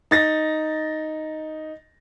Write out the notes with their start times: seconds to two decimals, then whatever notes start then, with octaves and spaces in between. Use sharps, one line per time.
0.11 D#4 A6 A#6